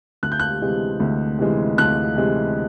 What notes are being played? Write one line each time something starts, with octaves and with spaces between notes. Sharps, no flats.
D2 F#6
G6
F#6
C3 E3 G#3
D2
C3 E3 G#3
D2 F#6
C3 E3 G#3